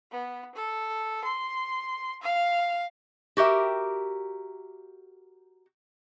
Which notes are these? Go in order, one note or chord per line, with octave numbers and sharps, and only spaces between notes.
B3
A4
C6
F5
F#4 G4 A#4 E5